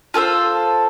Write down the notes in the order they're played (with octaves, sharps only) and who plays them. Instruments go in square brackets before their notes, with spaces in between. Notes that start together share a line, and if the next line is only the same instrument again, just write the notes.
[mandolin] F4 G#4 A4 C5